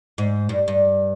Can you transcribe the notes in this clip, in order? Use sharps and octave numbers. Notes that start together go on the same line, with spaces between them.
G#2
G2
G2